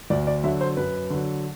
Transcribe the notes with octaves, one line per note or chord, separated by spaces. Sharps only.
D2 D5
D5
D3 F#3 E5
C5
F#2 B4
D3 F#3